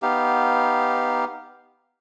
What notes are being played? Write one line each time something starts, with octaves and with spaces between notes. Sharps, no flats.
B3 D#4 G4 F5